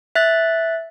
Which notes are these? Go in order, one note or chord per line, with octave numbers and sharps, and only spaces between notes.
E5 F#6 A6